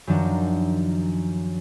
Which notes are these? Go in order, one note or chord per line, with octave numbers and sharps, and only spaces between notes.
F#2 D#3 F3 D4 A#4 F#5